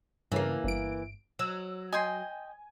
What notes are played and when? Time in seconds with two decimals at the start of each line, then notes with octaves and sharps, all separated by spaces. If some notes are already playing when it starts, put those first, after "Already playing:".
0.32 G2 C#3 E3 A#3
0.64 G1 D7
1.39 F#3 E6
1.93 D#5 G5 G#5 C6